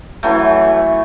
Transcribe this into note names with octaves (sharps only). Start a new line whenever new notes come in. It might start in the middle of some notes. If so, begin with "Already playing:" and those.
E3 F#3 A3